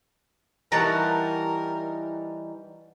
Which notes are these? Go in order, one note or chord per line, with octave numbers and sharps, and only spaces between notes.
E3 G3 D#4 F#4 A#4 A5 A#5